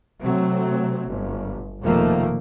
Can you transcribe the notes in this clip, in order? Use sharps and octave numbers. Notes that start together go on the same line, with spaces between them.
C3 F#3 A3 C4
G1
F1 B2 D#3 F3 A3 A#3